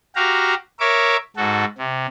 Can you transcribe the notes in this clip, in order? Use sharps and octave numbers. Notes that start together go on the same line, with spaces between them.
F#4 G4 F5 A#5
A#4 C#5 E5 D6
G#2 F#4 A4
C3